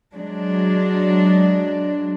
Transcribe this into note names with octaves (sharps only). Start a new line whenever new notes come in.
F#3 G#3 D4